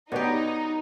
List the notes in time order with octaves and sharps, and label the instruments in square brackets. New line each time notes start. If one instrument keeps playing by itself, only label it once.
[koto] B2 G4 [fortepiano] B3 C#5 D5 [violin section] D#4